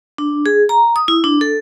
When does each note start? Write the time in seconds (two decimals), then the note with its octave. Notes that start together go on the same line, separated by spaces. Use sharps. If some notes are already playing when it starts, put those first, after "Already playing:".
0.18 D4
0.46 G#4
0.69 A#5
0.96 D#6
1.08 E4
1.24 D4
1.41 A4